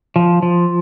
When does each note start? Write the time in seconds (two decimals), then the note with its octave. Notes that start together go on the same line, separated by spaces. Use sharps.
0.16 F3
0.42 F3